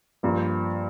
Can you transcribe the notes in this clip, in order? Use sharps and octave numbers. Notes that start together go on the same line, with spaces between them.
G2 F3 A#3